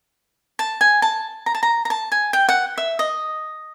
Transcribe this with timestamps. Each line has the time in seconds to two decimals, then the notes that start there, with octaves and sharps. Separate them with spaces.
0.59 A5
0.81 G#5
1.02 A5
1.46 A#5
1.55 A5
1.63 A#5
1.85 A#5
1.90 A5
2.12 G#5
2.33 G5
2.49 F#5
2.78 E5
2.99 D#5